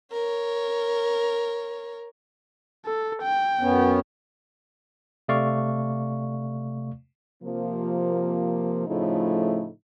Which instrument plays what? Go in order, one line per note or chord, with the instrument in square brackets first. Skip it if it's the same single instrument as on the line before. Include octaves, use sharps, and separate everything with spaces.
[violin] A#4 C#5
[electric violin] A4
G5
[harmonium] F#2 B3 C#4
[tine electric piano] C3 A3 D5 F5 C#6
[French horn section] C3 F3 A#3
A2 C#3 F3 A3 D#4 E4